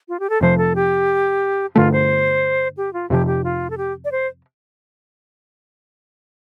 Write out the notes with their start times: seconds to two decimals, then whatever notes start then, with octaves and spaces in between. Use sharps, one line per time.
0.09 F4
0.20 G4
0.30 A4
0.41 F2 C3 F3 C5
0.58 A4
0.75 G4
1.75 G2 D3 A3 F4
1.92 C5
2.77 G4
2.93 F4
3.10 F2 C3 F3 G4
3.27 G4
3.44 F4
3.70 A4
3.78 G4
4.05 D5
4.12 C5